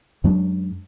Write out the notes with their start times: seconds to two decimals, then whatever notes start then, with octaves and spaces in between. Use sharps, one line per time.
0.24 F#2 F#3 G#3 D4